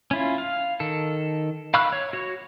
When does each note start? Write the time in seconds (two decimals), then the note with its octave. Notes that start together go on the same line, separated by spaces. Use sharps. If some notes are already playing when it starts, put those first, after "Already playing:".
0.11 C#4 E4 F4
0.38 F5
0.80 D#3 A4
1.74 F5 B5 C#6 E6 F#6
1.92 C#5
2.13 F#4 C#5